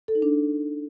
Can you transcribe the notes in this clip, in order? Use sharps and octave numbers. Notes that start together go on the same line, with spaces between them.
A4
D#4
D4